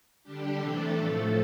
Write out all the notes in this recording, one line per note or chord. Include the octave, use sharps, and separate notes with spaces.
D3 G3 D4 G4
C3 E3 A3 D4 A4
A2 F3 A3